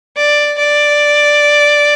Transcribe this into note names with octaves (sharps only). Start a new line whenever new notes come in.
D5
D5